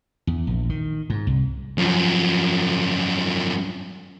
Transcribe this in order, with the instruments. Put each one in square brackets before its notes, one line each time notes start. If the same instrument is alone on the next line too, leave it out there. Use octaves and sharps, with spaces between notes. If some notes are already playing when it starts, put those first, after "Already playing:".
[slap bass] E2
A#1
D#3
G#2
C2
[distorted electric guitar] F#2 F3